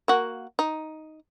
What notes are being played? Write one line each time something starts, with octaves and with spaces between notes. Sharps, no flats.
A#3 F#4
D#4